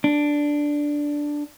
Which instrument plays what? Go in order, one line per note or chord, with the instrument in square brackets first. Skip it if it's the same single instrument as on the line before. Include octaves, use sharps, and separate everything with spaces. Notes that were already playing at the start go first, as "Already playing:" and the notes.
[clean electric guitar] D4